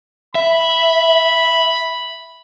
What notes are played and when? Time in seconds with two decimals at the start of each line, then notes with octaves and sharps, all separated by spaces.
0.35 E5 B5